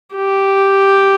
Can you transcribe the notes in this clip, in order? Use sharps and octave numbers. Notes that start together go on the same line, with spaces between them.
G4